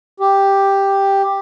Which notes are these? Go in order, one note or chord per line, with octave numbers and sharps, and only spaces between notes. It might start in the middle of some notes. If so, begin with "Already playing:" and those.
G4